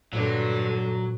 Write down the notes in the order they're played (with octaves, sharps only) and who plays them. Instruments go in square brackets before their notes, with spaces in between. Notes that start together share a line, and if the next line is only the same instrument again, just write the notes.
[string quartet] G2 D3 [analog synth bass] A#2 [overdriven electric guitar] F#3